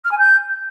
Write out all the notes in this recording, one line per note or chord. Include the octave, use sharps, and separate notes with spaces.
F6
G#5
G6